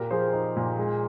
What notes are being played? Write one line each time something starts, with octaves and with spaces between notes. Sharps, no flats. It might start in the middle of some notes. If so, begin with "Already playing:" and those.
Already playing: A#2 G4 A#4
F3 G#4 C5
D#4
A#2
G#3